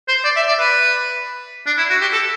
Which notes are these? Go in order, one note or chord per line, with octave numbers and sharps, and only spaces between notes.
C5
D5
E5
D5
B4
D4
E4
F#4
G4
A4